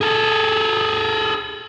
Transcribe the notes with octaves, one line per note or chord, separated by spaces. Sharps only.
G#4 A4